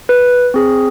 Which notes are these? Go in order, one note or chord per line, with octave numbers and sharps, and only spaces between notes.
B4
C4 G#4